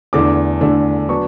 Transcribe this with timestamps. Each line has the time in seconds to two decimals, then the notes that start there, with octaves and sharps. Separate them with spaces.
0.13 E2 D3 A3 D4 D6
0.61 E2 D3 A3 D4
1.09 F#3 B3 D4 C#6